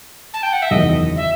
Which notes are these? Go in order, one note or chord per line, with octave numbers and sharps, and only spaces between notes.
A5
G5
F#5
E5
F#1 E2 D#3 F#3 D#5
E5